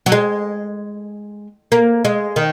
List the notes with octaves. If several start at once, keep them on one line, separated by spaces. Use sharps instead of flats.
F#3
G#3
A#3
G#3
D#3